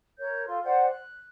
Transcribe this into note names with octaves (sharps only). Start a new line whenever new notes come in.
A#4 C#5 G6
F4 A4 C6
C5 D5 F#5 G5
F#6